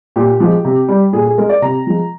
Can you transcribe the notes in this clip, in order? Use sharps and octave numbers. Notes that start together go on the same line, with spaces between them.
A#2 G4
F3 G#3
C3
G3
A#2 G#4
G#4
G#3 A#4
D5
C3 A#5
F3 G#3